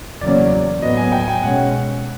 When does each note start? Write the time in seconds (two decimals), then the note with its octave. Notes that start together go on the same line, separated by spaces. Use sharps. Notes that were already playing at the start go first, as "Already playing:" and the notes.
0.21 E2 C#3 F#3 A#3 C#4 D5
0.81 A2 F#3 B3 D#5
0.97 G#5
1.12 G5
1.20 G#5
1.28 G5
1.43 B2 G#3 C#4 F#5